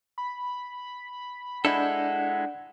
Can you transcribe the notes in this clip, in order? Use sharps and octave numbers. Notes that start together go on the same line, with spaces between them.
B5
G#3 D4 E4 A4 D5 F#5 G6